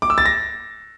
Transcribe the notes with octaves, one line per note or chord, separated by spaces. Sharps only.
D6
E6
A6
A#6